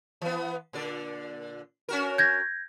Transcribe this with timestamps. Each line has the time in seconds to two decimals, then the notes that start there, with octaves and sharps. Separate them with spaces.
0.22 E3 B3
0.73 A#2 D3 D5
1.89 C#4 F#4 A#4
2.18 G6 G#6 A#6